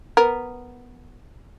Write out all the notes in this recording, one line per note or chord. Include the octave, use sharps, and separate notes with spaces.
B3 A#4